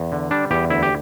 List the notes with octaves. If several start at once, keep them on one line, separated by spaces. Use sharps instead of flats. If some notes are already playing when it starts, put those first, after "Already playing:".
Already playing: E2
D3
G3 D4
E2 G4
D2 E4
G4